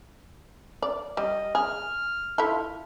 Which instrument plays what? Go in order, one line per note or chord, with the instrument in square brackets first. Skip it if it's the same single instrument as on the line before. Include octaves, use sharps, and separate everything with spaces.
[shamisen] D5
[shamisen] G3 [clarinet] D#5
[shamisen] G#4 [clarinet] F6
[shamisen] E4 F4 A4